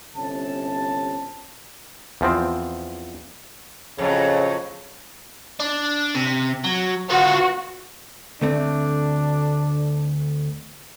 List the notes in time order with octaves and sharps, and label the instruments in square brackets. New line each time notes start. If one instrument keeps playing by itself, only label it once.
[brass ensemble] G1 C3 C#4 A5
[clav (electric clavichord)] E2 F3 C4
[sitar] F2 A2 F#3 [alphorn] C#3
[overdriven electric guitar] D4
C3
F#3
[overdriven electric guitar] B3 F4 [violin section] F#4
[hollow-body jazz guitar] D2 A3 C4 [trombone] D4